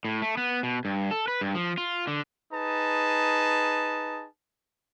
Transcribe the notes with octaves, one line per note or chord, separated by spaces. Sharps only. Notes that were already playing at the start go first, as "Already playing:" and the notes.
A2
A3
B3
B2
G2
A4
B4
G2
F3
F4
D3
D#4 G#4 B4 A5